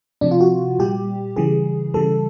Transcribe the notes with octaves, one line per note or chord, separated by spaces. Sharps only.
C3 F3 D4
F4
F#4
A#2 G3 G4
C#3 E3 G3 G#4
C#3 E3 G3 A4